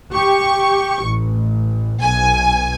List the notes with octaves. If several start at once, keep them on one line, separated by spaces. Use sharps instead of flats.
G4 C#6
A1
B1 G#5